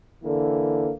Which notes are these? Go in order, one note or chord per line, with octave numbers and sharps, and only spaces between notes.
D3 E3 A#3